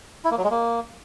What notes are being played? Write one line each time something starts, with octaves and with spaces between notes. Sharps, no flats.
E4
A#3
F#3
G#3
A#3